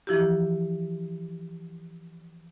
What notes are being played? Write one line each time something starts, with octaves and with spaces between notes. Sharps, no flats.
E3 F3 E4 F#4 G4